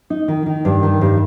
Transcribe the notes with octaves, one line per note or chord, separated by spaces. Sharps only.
D#4
D#3
D#3
G2
D#3
G2